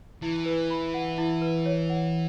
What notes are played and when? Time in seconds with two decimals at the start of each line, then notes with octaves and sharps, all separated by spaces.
0.22 E3 E4
0.46 B4
0.70 B5
0.94 F#5
1.18 E4
1.42 B4
1.66 C#5
1.90 F#5